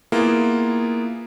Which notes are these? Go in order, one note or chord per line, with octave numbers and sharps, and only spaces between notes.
A#3 B3 E4 F4 G#4